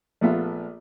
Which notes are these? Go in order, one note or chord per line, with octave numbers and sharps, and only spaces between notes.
A#1 A3 B3 F4 E5